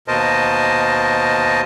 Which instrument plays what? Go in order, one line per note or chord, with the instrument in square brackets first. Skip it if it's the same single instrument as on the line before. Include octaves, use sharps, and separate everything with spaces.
[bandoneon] D#2 B2 A#4 C5 D#5 A5